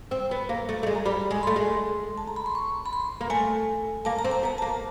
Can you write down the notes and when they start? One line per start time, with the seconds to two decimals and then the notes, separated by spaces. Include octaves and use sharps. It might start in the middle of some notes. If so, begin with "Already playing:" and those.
0.11 C4
0.31 B3
0.49 A#3
0.69 A3
0.83 A3
0.87 G#3
0.95 A#5
1.06 G3 B5
1.31 G#3 B5
1.43 A3 C6
1.56 G#3
2.18 A5
2.27 A#5
2.36 B5
2.46 C6
2.55 C#6
2.86 B5
2.93 C6
3.21 A#3
3.30 A3 G#5
4.05 A#3 A5
4.19 A#5
4.24 C4
4.31 A5
4.43 B3 A#5
4.58 A5
4.62 A#3